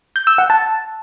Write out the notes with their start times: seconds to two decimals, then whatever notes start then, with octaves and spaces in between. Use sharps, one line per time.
0.16 G6
0.27 E6
0.38 F#5
0.50 A5